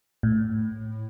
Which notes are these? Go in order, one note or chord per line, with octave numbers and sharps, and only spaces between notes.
A2